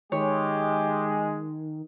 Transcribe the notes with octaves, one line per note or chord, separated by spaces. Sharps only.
D#3 G#3 G4 C#5